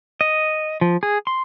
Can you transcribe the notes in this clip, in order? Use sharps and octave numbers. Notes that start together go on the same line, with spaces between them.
D#5
F3
G#4
C6